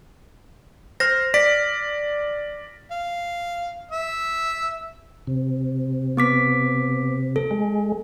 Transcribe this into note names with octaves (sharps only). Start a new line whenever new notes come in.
C5 F6 A#6
D5 B6
F5
E5
C3
B3 D6 B6
A4
G#3